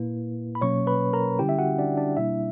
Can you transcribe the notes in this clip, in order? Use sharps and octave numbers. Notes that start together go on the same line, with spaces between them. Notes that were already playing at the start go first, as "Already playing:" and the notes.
Already playing: A#2 A#3 E4 B4
B5
B2 F#3 A#3 C#4 C#5 C#6
B4 B5
A#4 A#5
D3 G3 C#4 E4 G4 G5
E5
F#4 F#5
D4 D5
D4 D5
B2 G3 A#3 D4 E4 E5